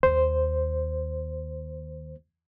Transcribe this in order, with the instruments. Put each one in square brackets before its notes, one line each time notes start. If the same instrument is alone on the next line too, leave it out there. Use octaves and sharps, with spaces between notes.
[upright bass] D#2 [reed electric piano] C5